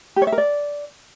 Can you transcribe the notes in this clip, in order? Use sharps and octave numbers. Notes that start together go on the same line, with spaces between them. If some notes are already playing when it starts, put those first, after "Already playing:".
G4
C#5
E5
A#4
D5